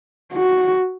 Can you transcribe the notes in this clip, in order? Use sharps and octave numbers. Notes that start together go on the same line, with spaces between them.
F#4